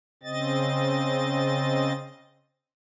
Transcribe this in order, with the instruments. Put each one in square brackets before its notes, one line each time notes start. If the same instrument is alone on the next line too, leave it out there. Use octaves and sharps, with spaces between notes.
[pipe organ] C#3 C4 D#5 A6